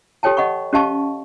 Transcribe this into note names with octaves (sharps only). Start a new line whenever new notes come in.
G4 A4 C#5 G5 A5
D#5 F#5 B5 C#6
C#4 G4 D#5 F5 A5 C#6